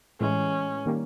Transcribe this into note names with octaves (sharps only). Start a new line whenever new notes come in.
A2 E3 G#3 C#4
D#3 G3 A#3 C#4